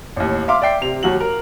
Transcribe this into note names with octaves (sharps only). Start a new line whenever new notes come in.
A1 D#2
E5 F5 C6 D6
D5 E5 G5 C7
C3 F7
D#2 F#3 F#4 F#7
A#4